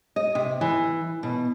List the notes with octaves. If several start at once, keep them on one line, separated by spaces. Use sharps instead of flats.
D#5
C3
E3
B2